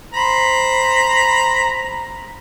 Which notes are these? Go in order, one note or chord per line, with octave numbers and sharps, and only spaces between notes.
C5 A#5 B5